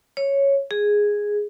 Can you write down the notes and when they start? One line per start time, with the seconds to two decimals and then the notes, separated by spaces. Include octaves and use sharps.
0.17 C#5
0.71 G#4